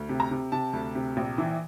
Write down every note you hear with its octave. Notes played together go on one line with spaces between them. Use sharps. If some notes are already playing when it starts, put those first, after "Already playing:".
Already playing: D2
C3
A#5
C3
C3 A5
D2
C3
A#1
E3